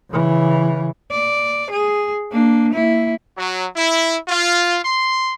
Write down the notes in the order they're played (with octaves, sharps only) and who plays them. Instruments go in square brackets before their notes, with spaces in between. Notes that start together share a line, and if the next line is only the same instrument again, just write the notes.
[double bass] C#3 E3
[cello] D5
G#4
A#3 D4
A#3 E4
[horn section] F#3
E4
F4
C6